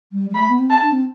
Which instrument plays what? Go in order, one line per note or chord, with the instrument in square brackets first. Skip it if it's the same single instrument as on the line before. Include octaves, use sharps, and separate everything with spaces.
[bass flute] G3
G3
[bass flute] A3 [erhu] B5
[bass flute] B3
C4
[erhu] A5
[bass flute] D4
C4